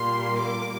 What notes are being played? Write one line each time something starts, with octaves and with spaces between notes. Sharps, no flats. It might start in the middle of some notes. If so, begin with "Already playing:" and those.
Already playing: A#2 G3 A#3 C6
D6